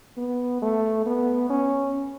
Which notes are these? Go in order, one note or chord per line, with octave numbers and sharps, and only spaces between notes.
B3
A3
B3
C#4